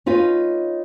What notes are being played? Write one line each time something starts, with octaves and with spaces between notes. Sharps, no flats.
C#4 D#4 F4 B4